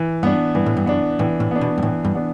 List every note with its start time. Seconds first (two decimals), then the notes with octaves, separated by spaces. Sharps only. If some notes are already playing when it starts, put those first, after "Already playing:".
Already playing: E3
0.23 G2 B3 D4
0.55 G2 E3
0.66 A2
0.77 G2
0.86 F#2 B3 D4
1.19 A2 E3
1.40 A2
1.51 B3 D4
1.61 B2
1.78 G2
1.82 A2 E3
2.05 G2
2.15 B3 D4